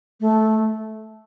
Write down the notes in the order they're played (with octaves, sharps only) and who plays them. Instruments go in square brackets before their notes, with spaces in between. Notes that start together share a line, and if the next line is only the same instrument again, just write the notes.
[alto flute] A3